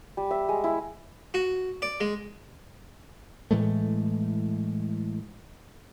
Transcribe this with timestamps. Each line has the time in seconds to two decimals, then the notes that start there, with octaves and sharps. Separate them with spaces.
0.17 G3
0.31 E5
0.49 G#3
0.64 E4
1.34 F#4
1.82 D5
2.00 G#3
3.51 A2 E3 G#3 A3